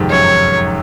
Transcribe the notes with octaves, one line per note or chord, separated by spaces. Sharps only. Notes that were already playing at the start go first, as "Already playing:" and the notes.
Already playing: F2 G#2 C3 D#3
F#2 C#5